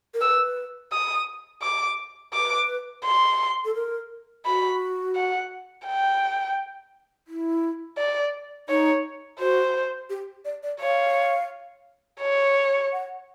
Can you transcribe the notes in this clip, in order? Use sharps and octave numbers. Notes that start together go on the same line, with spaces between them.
A#4
B4 E6
D#6
D6
B4 D6
C6
A4
A#4
F#4 B5
F#5
G5
E4
D5
D#4 C#5
F#4 C5
G4
D5
D5
C#5 F5
C#5
F#5